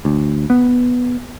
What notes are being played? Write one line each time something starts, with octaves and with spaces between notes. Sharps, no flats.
D2
B3